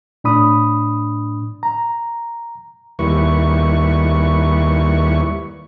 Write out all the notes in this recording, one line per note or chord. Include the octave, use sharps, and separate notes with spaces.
A2 D4 B5 D#6
A#5
D#2 G3 E4 B4 C#6